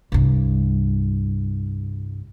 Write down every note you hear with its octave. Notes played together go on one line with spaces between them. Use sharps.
C2 G2